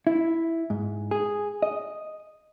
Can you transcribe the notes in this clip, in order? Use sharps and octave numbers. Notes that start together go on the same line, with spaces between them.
E4
G#2
G#4
D#5